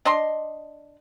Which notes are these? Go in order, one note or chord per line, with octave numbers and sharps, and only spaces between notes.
D4 D#5 C6